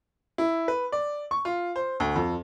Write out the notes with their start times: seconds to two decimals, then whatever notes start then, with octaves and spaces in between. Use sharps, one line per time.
0.38 E4
0.68 B4
0.92 D5
1.31 C#6
1.45 F4
1.76 C5
2.00 D2
2.16 F2